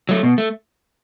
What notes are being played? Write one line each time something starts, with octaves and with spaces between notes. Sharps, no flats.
F#3 A3
B2
A3